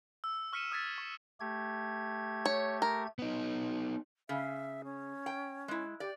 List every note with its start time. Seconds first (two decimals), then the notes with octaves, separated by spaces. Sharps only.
0.24 E6
0.53 C#6 F6 B6 C#7 D#7 E7
0.71 D#6 E6 G#6 A6 B6
0.98 C#6 E7
1.40 A3 G4 G#6
2.46 C#5
2.82 A#4
3.19 B3 D#4
4.29 C#3 E5
4.84 C#4
5.26 G5
5.68 G#3 E4
6.00 G4 D5